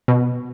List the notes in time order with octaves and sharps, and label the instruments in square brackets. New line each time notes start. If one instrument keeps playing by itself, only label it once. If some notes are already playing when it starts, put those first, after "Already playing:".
[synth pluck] B2